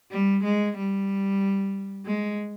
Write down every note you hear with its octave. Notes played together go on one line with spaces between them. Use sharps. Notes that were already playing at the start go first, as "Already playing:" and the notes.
G3
G#3
G3
G#3